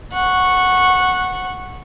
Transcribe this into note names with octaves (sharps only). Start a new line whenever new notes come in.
F#5 C#6